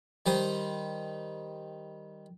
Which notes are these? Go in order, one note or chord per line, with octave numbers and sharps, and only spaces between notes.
D#3 G3 C5 D#6